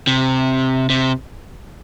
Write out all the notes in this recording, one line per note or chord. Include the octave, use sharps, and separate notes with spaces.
C3
C3